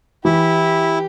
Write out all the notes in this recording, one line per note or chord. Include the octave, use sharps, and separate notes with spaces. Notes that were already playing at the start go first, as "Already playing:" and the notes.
E3 E4 G4